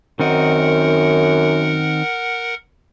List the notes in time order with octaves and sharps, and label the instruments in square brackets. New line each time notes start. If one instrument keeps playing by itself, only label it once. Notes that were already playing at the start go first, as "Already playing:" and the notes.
[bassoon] F#2 [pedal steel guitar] D#3 C4 D#4 [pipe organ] A#4 F#5